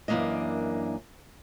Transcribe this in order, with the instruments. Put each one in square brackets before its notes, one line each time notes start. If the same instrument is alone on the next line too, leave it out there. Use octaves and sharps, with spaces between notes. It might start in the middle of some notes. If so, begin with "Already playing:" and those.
[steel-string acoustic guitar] F#2 E3 A#3 D4 D#5